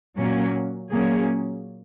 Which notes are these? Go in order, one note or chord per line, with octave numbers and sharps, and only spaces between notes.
A#2 F#3 A#3 C#4
A#2 F#3 A#3 C#4 G#4